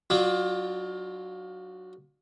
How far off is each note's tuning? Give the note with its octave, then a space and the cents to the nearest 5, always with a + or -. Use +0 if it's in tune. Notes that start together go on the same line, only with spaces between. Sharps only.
F#3 +0 D4 +30 F4 +25